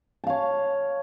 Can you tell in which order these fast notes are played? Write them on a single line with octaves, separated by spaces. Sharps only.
A5 F5 C#5